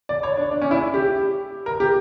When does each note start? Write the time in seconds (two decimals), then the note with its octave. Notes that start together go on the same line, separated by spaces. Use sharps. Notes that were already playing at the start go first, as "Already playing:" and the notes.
0.09 D5
0.23 C#5
0.37 D4
0.51 D4
0.62 C#4
0.71 E4
0.94 G4
1.66 A#4
1.80 G4